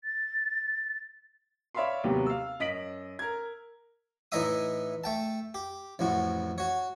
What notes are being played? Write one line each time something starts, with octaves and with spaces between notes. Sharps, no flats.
A6
C#5 D5 E5 F5 B5 C6
D#2 C3 F#3 B3 G4
F5 E6
F#2 D#5 B6 D7 F#7
A#4 G#6
A2 E3 D#4 D#5 E5 D#6
A3 G5 A5
G4
A1 F2 A2 F#4
F#4 C#5